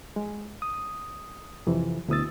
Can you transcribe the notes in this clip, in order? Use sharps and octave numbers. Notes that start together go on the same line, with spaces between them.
G#3
D#6
F2 C3 E3
D2 B2 E4 D#6 E6 A6